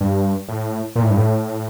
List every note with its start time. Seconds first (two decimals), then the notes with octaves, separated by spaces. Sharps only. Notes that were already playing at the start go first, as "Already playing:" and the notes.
0.01 G2
0.48 A2
0.96 A#2
1.03 A2
1.10 G2
1.17 A2